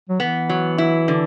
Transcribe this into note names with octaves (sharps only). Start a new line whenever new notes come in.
F#3
E3 B3
F#3
E4
D3